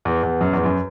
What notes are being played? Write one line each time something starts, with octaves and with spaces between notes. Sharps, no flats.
E2
E2
F#2
E2
F#2